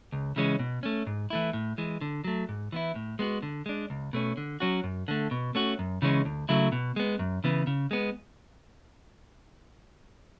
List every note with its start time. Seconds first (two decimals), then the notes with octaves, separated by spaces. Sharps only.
0.12 C#2
0.36 C#3 E3 G#3 C#4
0.59 B2
0.83 A3 C#4
1.07 G#2
1.30 E3 A3 E4
1.53 A2
1.78 E3 G#3
2.01 D3
2.24 F#3 A3
2.49 G#2
2.72 E3 B3 E4
2.95 A2
3.19 G#3 B3 F#4
3.42 D3
3.66 G#3 D4
3.90 C#2
4.13 B2 A3 C#4
4.37 D3
4.60 F#3 C#4 F#4
4.84 F#2
5.08 D3 A3
5.31 B2
5.55 A3 C#4 F#4
5.79 F#2
6.02 C#3 E3 G#3 C#4
6.25 D2
6.49 C#3 F#3 A3 E4
6.72 B2
6.96 G#3 B3
7.19 F#2
7.44 C#3 E3 B3
7.67 C#3
7.91 G#3 B3